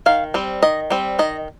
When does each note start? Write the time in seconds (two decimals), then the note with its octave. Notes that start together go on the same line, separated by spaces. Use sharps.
0.06 D#3 F5
0.34 G3 C4
0.63 D#3 D#5
0.90 G3 C4
1.19 D#3 D#5